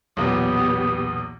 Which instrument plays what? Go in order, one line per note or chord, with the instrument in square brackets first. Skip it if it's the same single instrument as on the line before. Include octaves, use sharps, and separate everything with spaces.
[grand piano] B1 E2 A#2 [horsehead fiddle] B3 G4 [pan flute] D#6